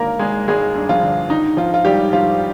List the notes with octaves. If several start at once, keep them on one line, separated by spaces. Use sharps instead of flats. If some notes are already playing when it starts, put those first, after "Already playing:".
Already playing: G#1 D3 A#3 A#4
G#1 G#3 G#4
G#1 G#3 G#4
G2
F3 F4
D3
D#3 D#4
G#2 F3 F4
F4
G#1 G3 G4
G#2 F3 F4